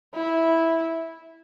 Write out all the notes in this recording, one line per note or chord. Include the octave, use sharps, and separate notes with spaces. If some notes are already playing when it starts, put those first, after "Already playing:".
E4